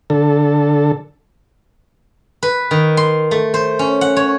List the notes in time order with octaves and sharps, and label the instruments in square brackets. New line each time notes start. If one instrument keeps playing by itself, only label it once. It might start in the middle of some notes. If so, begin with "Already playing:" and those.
[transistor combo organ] D3 A4
[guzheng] B4
D#3
C6
A3
C5
C#4
F#5
C#5